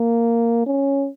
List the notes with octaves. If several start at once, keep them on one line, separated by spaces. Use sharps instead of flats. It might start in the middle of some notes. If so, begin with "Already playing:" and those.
Already playing: A#3
C#4